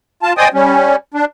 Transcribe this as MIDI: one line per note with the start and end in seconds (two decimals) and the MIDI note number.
0.23 0.33 65
0.23 0.33 81
0.38 0.48 72
0.38 0.48 74
0.38 0.48 75
0.38 0.48 79
0.38 0.48 80
0.38 0.48 87
0.54 0.96 55
0.54 0.96 61
1.14 1.25 62